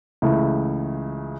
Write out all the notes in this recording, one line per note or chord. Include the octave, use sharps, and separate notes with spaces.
C#2 C#3 E3 A3 E4